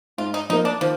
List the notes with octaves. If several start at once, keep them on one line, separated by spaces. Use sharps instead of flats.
G#2 F4
D#4
F3 A#3 D#4
D4
D#3 F3